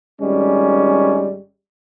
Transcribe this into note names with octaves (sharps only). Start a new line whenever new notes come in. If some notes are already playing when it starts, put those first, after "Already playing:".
G#1 G3 G#3 C#4